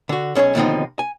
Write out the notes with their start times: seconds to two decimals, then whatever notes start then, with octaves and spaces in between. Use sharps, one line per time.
0.09 D3 F#4
0.35 B1 C#4 G#4 C5 C#5
0.55 D#2 B2 D3 F3 C4 D#4
0.99 G#5